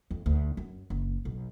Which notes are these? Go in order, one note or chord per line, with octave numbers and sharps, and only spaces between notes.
F2
D2
F#2
F#1
B1